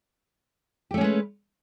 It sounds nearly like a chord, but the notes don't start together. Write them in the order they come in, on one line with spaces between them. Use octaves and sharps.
G4 A3 C#4 G#3 B4